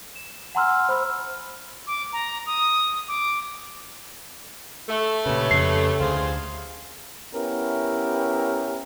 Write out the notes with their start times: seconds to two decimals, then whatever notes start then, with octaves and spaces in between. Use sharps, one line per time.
0.15 E7
0.55 F#5 G#5 A#5 C6 E6 F6
0.89 C5 B5 E6 F6
1.87 D6
2.13 A#5
2.46 D#6
3.08 D6
4.89 A3
5.26 A#2 C#3 G4 B4 C#5
5.51 F2 C#3 C7
6.00 D2 G#4 C5 F5
7.34 B3 C#4 E4 G4 A#4